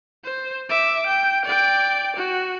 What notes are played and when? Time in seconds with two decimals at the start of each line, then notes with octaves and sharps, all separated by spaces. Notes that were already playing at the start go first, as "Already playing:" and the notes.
0.24 C5
0.69 E5 D6
1.07 G5
1.45 D5 G5
2.16 F#4